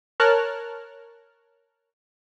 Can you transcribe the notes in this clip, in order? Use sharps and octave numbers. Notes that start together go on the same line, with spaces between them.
A#4 C#5 A5 F6 F#6